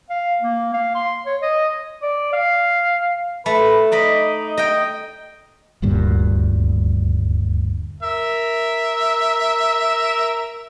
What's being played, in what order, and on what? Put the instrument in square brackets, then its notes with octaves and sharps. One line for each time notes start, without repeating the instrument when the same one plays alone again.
[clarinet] F5
A#3
F5
C6
C#5
D#5
[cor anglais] D5
F5
[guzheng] A3 [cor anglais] B4
[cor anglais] D#4 [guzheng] D5 D#5 B5
[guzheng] D#5 G5
[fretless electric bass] D#1 D2 G2 A#2
[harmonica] A#4 E5